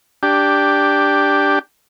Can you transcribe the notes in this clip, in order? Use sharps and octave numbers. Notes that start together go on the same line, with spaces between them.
D4 G4